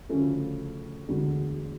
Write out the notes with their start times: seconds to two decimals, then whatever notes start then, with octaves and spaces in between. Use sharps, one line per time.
0.09 D2 C#3 F3 A3 C#4
1.08 E1 D2 D3